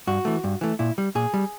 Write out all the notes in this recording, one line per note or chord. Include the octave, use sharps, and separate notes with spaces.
G2 F#4
E3 A3
G2
E3 A3
A#2 E4
G3
A#2 G#4
G3